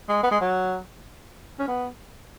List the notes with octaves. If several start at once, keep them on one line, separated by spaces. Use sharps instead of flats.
G#3
B3
G#3
F#3
C#4
B3